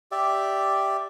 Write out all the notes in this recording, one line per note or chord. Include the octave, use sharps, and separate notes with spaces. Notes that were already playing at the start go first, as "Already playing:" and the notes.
G4 D5 E5